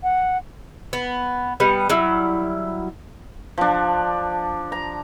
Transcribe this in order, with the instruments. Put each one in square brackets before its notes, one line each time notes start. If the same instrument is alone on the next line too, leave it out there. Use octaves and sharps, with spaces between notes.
[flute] F#5
[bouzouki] B3
G3 B3 D#5
F#3 G3 E4
[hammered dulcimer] F3 D4
A#5